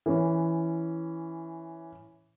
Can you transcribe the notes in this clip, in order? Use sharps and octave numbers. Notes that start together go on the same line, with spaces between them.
E3 C#4